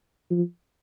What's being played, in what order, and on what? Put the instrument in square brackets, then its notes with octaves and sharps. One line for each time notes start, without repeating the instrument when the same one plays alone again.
[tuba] F3